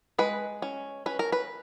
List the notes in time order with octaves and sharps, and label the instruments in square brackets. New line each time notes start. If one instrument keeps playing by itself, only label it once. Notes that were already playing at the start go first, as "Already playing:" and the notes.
[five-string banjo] G#3 B4
C#4
C#4 B4
A#4
B4